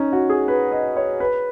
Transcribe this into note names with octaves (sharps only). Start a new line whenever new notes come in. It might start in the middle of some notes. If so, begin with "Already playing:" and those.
Already playing: C#4 D#4
F#4
G#4
B4
D#5
C#5
B4